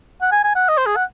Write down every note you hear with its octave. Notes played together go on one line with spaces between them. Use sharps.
F#5
G#5
G#5
F#5
D#5
C5
G#4
F#5